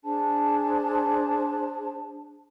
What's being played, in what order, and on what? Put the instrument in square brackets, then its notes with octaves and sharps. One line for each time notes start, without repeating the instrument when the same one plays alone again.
[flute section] D4 G#4 C5 A5